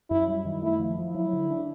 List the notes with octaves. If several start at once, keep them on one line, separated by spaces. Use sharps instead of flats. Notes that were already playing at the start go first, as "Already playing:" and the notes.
F#2 E4
G3
D#3
A3 E4
F3
F3
F#3 E4
D3
D4